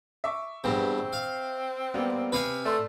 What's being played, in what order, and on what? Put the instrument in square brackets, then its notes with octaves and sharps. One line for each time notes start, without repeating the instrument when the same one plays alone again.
[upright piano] E5 C#6 D6
[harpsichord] E2 G2 [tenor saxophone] C4
[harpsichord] F5
[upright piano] G3 A#3 B3
[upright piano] C3 [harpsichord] B4 F5 G#5
[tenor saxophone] A3 [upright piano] D5 C6